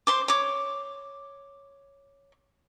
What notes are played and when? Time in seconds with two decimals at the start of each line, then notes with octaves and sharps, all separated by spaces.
0.07 C5 C6 D6
0.28 C#5 D6